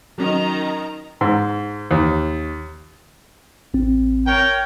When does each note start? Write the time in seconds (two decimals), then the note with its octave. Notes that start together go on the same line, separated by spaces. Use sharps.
0.18 D#3 F#3 C#4 D#5 A#5
1.21 G#2
1.91 D#2
3.74 A1 C4
4.27 A#4 C#5 G5